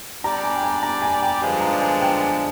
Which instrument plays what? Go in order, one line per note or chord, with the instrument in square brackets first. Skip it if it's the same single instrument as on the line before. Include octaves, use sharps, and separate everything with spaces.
[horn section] G3 D4 G4 D5 [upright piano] A#5
[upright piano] G#5
G5
G#5
A#5
G#5
G5
[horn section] G2 D3 F3 G#3 D4 [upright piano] G#5
[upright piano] A#5
G#5
G5
G#5